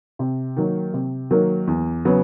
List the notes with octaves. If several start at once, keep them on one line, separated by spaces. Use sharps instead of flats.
C3
D#3 F#3 A#3
C3
D#3 F#3 A#3
E2
C#3 F#3 B3